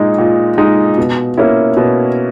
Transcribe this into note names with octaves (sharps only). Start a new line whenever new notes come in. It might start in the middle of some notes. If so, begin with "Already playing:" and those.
Already playing: A#2 G#3 D#4
A#2
G#3 D#4
B2
A#3 C#4 E4
B2